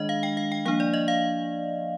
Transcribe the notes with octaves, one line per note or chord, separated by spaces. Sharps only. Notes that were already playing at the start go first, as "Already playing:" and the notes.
Already playing: D#3 G#3 D4 D#5
F5
G5
F5
G5
F3 A#3 D4 F5
D5
D#5
F5